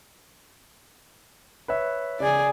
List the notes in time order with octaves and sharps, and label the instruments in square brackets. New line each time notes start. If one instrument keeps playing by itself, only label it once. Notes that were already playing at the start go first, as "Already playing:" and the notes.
[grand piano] B4 C#5 E5
[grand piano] C#3 [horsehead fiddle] G#4 D5